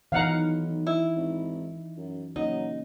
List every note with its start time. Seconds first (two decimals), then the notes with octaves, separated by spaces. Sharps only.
0.12 B1 E3 D#4 F5 F#5 A#5
0.87 E4
1.16 G#1
1.97 F#2
2.36 F#3 A#3 C#4 D#4